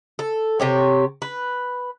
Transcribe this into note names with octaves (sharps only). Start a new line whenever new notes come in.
A4
C3 G4 C#5
B4